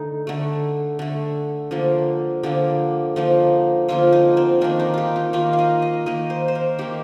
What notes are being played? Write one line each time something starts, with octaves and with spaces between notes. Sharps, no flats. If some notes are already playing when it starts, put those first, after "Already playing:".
Already playing: D3 A3 D#4
D3 A3
D3 A3
D3 F3 A#3
D3 F3 A#3 G4
D3 F3 A#3 D#4
D3 F3 A#3 F4
D#4
C4
D#3 A#3 D4
D#4
F4 G4
D#4
D#3 A#3 F4
F5
D#5
D#5
D#3 A#3 D#5
C5
C5
A#4
D#3 A#3 G4